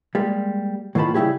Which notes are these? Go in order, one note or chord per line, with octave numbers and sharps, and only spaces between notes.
G3 G#3 A#3
A2 D#3 A#3 F4 A5 B5
C#3 G3 E4 G4 G#4